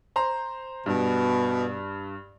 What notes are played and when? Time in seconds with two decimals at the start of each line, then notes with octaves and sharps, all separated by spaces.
0.16 C5 A#5 C6
0.86 G2 B2